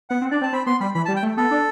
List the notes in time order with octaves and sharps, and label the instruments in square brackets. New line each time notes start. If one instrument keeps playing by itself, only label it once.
[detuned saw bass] B3 [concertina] F#5
[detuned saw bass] C4
[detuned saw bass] D4 [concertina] D5
[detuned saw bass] C4 [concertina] A5
[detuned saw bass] C4 [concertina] B5
[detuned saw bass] B3 [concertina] C6
[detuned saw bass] G3 [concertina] B5
[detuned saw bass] E3 [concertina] B5
[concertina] A5
[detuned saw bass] G3
[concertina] G5
[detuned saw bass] A3
[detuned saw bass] B3 [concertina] A4
[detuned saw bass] D4